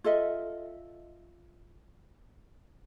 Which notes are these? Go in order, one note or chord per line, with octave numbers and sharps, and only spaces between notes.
F4 A4 D#5 E5